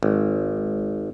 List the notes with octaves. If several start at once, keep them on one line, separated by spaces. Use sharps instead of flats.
G#1